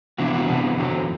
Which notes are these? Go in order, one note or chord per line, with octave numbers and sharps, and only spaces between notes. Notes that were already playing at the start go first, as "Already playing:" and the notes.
C3 E3 B3 D4 F#4
E4
F#4
C3 E3 B3 D4
E2 D3 F#3 C4